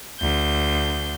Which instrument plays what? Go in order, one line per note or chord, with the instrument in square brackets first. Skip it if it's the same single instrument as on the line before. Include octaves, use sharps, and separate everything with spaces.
[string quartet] D2 G6